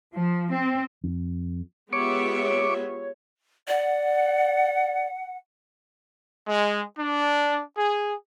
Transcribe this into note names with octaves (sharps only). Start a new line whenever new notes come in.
F3
C4
F2
G#3 B3 F4 G4 C#5 E5 C#6 D6
D5 F#5
G#3
D4
G#4